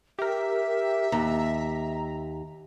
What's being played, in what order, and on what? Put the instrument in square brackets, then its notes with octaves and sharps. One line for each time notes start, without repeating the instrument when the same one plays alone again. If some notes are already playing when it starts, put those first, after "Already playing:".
[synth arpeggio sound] G4 A#4 [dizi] E5
[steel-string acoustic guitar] D#2 [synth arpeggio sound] A#5